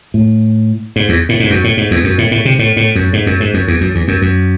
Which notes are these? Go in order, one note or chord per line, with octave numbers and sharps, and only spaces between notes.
A2
G#2
E2
A2
G#2
F#2
A2
G#2
E2
F#2
A2
A2
C3
A2
A2
F#2
G#2
F#2
G#2
F#2
E2
F#2
E2
F#2
F#2